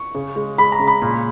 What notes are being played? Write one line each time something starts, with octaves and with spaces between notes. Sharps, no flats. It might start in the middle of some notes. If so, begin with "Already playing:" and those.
Already playing: C#6
C#3
G#3
G#3 B5
A#5
C#3
B5
A#2